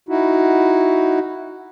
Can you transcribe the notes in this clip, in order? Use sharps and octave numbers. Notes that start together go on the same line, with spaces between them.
D#4 E4 F#4